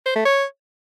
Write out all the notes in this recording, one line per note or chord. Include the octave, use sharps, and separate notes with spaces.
C5
A3
C#5